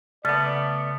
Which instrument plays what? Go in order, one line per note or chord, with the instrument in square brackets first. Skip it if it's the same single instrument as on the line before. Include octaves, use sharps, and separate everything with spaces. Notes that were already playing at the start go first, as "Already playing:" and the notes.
[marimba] C#3 A6 [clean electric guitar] A3 B3 [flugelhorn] D5